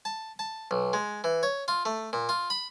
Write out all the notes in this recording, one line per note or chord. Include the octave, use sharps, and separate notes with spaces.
A5
A5
B1
G#3
E3
C#5
F4
A3
A#2
F4
B5